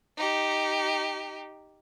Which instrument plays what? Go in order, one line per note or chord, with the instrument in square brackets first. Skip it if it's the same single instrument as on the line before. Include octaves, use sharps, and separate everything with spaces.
[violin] D#4 G4